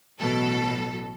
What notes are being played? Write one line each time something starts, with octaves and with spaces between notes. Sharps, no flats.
A1 B2 F#3 A4